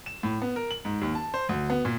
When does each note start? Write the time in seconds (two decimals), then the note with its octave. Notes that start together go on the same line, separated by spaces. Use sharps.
0.06 E7
0.23 A2
0.42 B3
0.56 A#4
0.71 F#7
0.85 G#2
1.02 D#2
1.15 A5
1.34 C5
1.49 D2
1.70 B3
1.85 A#2